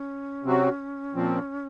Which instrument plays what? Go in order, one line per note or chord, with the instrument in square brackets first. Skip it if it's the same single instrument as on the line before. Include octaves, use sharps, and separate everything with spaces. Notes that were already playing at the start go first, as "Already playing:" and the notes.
Already playing: [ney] C#4
[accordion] C3 F#3 C4 F#4
A#2 F3 C4